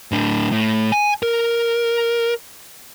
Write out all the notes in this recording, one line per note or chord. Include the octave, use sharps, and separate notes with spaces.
A2 D4
A2
G#5
A#4